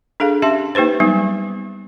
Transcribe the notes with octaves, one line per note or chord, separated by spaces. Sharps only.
D4 G#4 A4 F5
C#4 G4 E5 A5 C6
A#3 D#4 G4 B4 C5
F#3 G3 B3 D#4